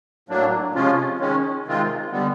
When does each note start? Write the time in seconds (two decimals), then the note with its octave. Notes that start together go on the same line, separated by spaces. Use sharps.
0.29 A2 F#3 A#3 D4
0.74 C3 F3 G#3 C#4 F4
1.20 D#3 G#3 C#4
1.65 C3 D#3 G#3 C4 F4
2.12 D3 G3 B3